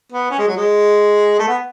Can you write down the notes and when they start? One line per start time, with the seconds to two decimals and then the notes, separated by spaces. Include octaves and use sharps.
0.12 B3
0.31 C#4
0.38 G#3
0.48 F#3
0.57 G#3
1.39 A3
1.48 B3